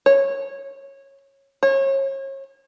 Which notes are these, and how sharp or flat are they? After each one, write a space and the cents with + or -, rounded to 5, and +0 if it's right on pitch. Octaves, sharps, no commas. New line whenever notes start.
C#5 -15
C#5 -35